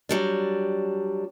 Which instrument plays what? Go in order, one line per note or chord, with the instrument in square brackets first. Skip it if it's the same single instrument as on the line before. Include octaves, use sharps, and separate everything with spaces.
[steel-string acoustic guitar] F#3 G3 D4